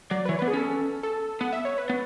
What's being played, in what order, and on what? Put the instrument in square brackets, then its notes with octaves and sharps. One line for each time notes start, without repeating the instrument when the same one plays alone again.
[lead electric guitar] F#3 [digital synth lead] D5
[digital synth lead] B4
[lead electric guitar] E3 [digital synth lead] C#5
[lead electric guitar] B3 [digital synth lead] B4
[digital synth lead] G#4
[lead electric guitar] C#4 [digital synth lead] A4
[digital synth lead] A4
[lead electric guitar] B3 [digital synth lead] F#5
[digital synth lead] E5
C#5
B4
[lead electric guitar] B3